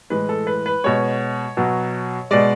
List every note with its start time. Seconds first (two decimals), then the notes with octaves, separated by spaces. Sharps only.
0.10 A2 E3 G#3 B4
0.29 A4
0.47 B4
0.66 B4
0.84 B2 G#3 C#5
1.57 B2 F#3
2.31 B2 G#3 D5